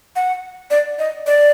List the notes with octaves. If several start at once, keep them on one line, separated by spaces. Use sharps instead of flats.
F#5
D5
D#5
D5